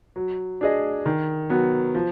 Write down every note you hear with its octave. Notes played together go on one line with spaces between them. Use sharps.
F#3
D4 G#4 D#5
D#3
F#3 B3
F3